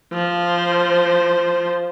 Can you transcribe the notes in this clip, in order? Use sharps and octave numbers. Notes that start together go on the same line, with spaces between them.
F3 C5